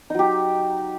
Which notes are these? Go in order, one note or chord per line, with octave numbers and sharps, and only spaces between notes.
F#3 D#4 G4